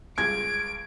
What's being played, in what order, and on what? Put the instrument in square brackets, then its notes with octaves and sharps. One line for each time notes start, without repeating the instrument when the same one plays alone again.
[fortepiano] C#2 G2 G#4 [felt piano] G#6 [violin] D7